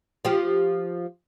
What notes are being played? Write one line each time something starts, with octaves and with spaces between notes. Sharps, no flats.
F3 G4